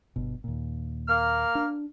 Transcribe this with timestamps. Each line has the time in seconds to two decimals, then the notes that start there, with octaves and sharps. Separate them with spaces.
0.16 G1 B2
0.44 D#2 A#2
1.08 A#3 F6
1.55 D4